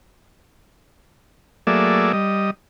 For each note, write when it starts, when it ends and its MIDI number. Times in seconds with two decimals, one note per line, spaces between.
1.67 2.12 54
1.67 2.12 57
1.67 2.12 58
1.67 2.12 68
1.67 2.12 74
1.67 2.12 76
2.13 2.51 55
2.13 2.51 75